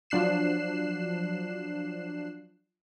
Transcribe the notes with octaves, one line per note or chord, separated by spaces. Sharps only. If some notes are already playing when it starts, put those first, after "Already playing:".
F3 F#3 D4 F#6 C7 E7